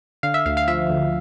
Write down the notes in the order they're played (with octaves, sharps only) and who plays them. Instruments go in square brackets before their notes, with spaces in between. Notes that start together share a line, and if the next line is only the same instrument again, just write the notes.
[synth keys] D3 F5
E5
D2 F5
F5
F3 E5
D2